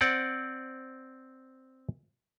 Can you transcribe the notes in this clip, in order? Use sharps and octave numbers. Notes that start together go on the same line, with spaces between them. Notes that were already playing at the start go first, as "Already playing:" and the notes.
C4 D5 F#5